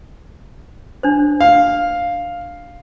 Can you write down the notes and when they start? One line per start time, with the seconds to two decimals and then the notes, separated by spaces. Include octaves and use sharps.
1.03 D4 C5
1.41 F5